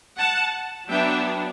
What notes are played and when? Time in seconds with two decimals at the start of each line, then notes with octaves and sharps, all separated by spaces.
0.18 F#5 A5
0.89 F#3 B3 D4 E5 G5